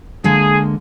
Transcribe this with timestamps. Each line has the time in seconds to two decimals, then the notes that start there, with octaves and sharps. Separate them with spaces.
0.24 D3 G#3 A#3 G#4